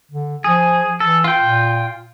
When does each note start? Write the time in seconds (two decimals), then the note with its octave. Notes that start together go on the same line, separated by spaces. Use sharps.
0.11 D3
0.44 F3 G#4
1.00 E3 A4
1.24 F4 G5
1.42 A#2